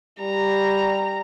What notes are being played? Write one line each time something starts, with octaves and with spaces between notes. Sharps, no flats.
G3 A#5